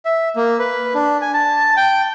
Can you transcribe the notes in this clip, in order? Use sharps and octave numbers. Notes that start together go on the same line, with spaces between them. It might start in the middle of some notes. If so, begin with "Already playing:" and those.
E5
A#3
B4
D4
G#5
A5
G5